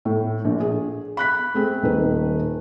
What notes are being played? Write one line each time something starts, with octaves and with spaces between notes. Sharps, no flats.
A2
A#1
G#4
B5 F#6 B6
A3 C4 G#4
D#1 D#3 B4